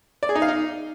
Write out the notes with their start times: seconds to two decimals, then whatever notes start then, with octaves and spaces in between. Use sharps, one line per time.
0.23 D5
0.29 G#4
0.36 D#4
0.42 F5
0.48 D#4